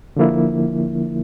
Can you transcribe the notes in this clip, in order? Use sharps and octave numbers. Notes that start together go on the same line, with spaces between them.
D3 F3 A#3 E4